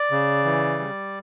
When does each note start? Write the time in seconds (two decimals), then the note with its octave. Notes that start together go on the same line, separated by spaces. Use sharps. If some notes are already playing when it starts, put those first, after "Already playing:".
Already playing: D5
0.11 C#3
0.45 E3
0.79 G3